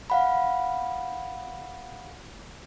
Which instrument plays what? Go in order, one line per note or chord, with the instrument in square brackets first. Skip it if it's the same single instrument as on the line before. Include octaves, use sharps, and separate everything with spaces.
[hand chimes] F5 F#5 B5